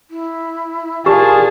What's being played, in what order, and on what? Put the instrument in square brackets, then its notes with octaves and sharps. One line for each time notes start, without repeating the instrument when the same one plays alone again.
[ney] E4
[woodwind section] A#2 F5 A5 [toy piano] G4 [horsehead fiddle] G#4